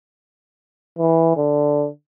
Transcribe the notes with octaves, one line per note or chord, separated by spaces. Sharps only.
E3
D3